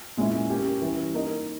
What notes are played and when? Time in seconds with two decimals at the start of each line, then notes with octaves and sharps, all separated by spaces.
0.17 A#2 G#3 C#4 E4
0.50 A#3 C#4 G4
0.82 E3 G3 C#4
1.14 A#3 D#4 A#4 D#5